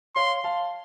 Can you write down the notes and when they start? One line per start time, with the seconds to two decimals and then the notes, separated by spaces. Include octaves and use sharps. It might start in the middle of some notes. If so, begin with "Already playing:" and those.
0.16 C#5 F5 C6
0.44 F5 A5